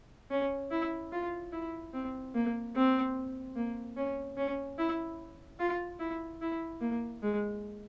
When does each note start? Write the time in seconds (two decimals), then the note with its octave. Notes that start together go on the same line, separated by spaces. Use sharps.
0.31 C#4
0.71 E4
1.12 F4
1.52 E4
1.94 C4
2.34 A#3
2.76 C4
3.56 A#3
3.97 C#4
4.37 C#4
4.78 E4
5.60 F4
6.00 E4
6.42 E4
6.81 A#3
7.23 G#3